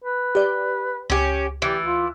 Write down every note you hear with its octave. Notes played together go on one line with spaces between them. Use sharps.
B4
G4 D5
C#2 C#4 G4
D2 E3 G4 A6
F4